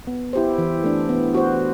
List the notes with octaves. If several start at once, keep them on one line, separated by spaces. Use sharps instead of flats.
B3
E4 G4 C5
E3
A3 D4
B3
F#4 C5